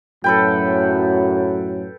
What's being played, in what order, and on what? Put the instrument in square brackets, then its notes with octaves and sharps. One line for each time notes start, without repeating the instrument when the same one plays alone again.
[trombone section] F#2 A2 F#3 [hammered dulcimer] A4 B4 G5